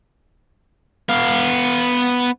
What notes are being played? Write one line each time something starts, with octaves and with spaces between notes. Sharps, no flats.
B3 F5